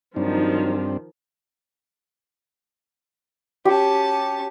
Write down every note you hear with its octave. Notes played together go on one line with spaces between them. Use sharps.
G2 D#3 F3 F#3 C4 D4 D#4
C#4 G4 A5